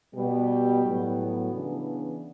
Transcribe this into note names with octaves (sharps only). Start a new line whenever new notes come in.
B2 G3 B3 G4
A2 F#3 B3
F#4
C#3 E3 B3 D4